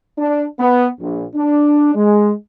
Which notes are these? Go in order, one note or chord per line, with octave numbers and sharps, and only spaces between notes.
D4
B3
A#1
D4
G#3